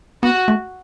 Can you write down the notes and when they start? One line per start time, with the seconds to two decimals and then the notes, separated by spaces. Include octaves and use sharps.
0.23 B3 F#4
0.48 A3